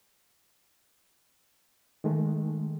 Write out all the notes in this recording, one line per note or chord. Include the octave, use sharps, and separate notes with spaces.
D#3 G#3 A3